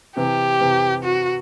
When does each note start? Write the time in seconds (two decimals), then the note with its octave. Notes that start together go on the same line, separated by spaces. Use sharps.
0.17 C3 E3 G4
0.60 C3 E3
1.03 F#4